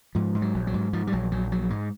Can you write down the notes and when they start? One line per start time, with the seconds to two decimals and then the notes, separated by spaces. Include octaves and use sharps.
0.15 G#2 F3
0.35 G#2
0.42 F#3
0.54 A#1
0.67 F#3
0.73 G#2
0.93 G#2 F3
1.07 G3
1.12 A#1 F#3
1.32 A#1 F#3
1.52 A#1 F#3
1.70 G#2 G#3